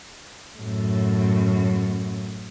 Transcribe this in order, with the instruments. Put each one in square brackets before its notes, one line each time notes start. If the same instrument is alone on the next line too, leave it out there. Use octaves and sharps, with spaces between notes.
[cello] F#2 A2